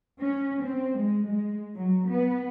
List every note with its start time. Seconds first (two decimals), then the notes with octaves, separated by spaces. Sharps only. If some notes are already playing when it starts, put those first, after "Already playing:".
0.20 C#4
0.62 C4
0.97 G#3
1.26 G#3
1.74 F#3
2.09 B3